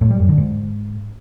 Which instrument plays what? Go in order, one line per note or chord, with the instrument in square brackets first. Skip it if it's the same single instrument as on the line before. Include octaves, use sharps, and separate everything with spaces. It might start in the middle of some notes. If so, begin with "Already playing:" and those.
[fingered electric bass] A2
G3
F#2
D3
G#2